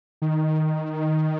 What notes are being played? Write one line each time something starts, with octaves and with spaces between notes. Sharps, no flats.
D#3